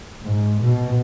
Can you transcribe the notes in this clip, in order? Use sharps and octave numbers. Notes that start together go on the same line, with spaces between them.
G#2
B2